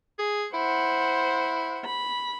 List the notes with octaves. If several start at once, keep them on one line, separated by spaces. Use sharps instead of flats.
G#4
E4 C5 F#5
B5